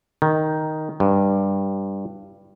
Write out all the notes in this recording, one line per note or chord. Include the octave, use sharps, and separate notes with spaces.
D#3
G2